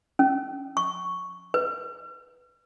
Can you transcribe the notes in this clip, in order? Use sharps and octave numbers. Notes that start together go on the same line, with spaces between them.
C#4
C#6
B4